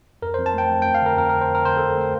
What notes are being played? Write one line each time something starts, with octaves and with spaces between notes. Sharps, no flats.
F2 A#4
F2 C5
A5
A3 G5
F2
F2 G5
F5
D3 A#4
F2 A#4
F2 A#4
C5
F2 A#4
D3 C5
F2 A4
A#4
A3 C5